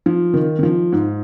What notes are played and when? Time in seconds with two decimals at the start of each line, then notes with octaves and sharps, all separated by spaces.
0.06 F3
0.34 D#3
0.59 D#3
0.63 F3
0.92 G#2